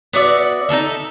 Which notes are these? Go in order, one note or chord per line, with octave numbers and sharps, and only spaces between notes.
B3 F#4 D5 E5
D#4 F#4 A4 E5